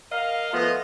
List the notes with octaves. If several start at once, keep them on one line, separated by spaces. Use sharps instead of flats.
A#4 D#5 F5
F3 A3 B3 F4 D#5